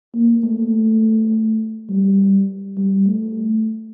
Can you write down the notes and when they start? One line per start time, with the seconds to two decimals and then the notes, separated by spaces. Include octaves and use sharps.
0.15 A#3
0.44 A3
1.89 G3
2.77 G3
3.07 A3